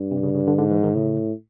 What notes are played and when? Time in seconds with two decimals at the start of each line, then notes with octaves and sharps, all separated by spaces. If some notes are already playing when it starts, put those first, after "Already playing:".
Already playing: G2
0.11 C3
0.23 C#3
0.34 C#3
0.47 D3
0.58 G#2 D3
0.71 E3
0.83 D#3
0.94 A2 C#3